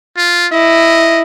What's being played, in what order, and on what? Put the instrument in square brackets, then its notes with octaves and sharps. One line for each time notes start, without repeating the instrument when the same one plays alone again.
[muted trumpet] F4
[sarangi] E4 [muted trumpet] D#5